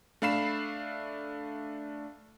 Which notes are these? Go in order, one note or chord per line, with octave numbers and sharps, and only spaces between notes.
A3 D4 F5 B5 C7 E7